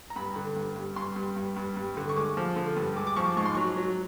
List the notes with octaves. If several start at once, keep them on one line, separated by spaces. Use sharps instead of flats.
A#5
G2 B5
D3
G2
G2
G2 C6
G2
G2
G2
G2
D3
C#6
G#3 D6
F3
D3
G2
G#3 D6
D6
F3 C#6
D6
G#2 C#6
C6
F#3 C#6
F#3